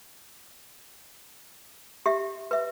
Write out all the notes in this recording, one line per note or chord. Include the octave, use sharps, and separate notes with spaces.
G4 E5
B4 E5